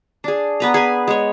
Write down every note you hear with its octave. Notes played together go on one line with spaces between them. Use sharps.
D4 G#4
B3 B4 A#5
G#4 B4 G#5
G#3 C#5